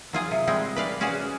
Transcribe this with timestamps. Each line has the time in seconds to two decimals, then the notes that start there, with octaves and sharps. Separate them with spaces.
0.13 F#3 F4 G#4
0.31 C3
0.47 G3 G#3 C4
0.76 B4 D5 F5
1.01 C#4 F#4 G#4 D5